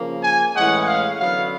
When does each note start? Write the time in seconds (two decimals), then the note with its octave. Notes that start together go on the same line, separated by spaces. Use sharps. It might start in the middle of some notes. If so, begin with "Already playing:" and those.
Already playing: C#3 F3 A#3
0.23 G#5
0.55 A2 E3 G#3 C#4 F#5
0.87 F5
1.19 F#2 D3 F#3 B3 F5